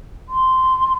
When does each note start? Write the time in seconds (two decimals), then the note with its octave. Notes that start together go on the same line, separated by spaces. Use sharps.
0.29 C6